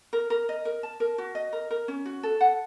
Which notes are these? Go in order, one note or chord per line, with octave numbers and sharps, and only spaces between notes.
A#4
A#4
D#5
A#4
A5
A#4
F#4
D#5
A#4
A#4
C#4
F#4
A4
F#5